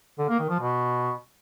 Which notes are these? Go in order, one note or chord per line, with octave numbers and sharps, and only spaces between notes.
D3
A#3
D#3
F3
B2